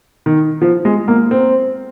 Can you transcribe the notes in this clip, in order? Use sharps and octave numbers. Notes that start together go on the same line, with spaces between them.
D#3
F3
G#3
A#3
C4